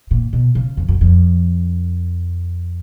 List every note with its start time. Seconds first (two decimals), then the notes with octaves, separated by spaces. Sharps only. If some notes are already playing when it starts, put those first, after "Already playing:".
0.11 A#2
0.33 B2
0.55 C#3
0.77 F2
0.88 F#2
1.01 F2